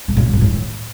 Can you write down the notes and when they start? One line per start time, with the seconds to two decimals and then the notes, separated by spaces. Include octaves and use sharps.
0.08 B2
0.17 A#2
0.25 C#3
0.33 A#2
0.42 A2